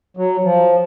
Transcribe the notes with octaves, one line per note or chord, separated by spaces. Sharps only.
F#3
F3